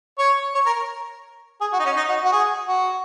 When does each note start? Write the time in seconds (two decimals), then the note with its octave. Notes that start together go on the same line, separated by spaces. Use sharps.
0.18 C#5
0.54 C#5
0.66 A#4
1.61 G#4
1.73 F#4
1.80 D#4
1.85 C#4
1.96 D#4
2.09 F#4
2.25 F#4
2.32 G#4
2.68 F#4